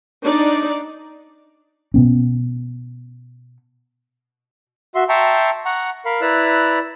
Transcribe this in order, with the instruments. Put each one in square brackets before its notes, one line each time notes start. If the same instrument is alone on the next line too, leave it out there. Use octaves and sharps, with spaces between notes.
[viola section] D4 D#4 D5
[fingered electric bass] B2 B3 C#4
[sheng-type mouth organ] F#4 E5 C6
E5 G5 A5 A#5 C6 C#6
F#5 A#5 C#6
A#4 F5 B5
E4 B4 D5 A#5 E6 F#6